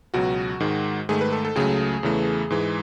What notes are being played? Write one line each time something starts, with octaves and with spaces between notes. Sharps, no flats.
C#2 B2 F#3 F#4
G#2 D#3 G#3
G#2 D#3 A3 G#4
B4
A4
A4
C#2 C#3 F#3 A3 G#4
E2 C#3 E3 A3
G#2 E3 G#3